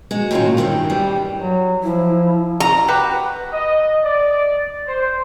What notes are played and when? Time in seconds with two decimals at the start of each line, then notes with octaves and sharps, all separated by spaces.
0.11 G#3 F#4
0.31 A2 D#3 F#3 A#3 C#4 F4
0.57 G2 D#3 A3 C4
0.90 G2 E3 G3
1.39 F#3
1.84 F3 E4
2.60 A#5
2.88 F#4 G4 B4
3.53 D#5
4.02 D5
4.87 C5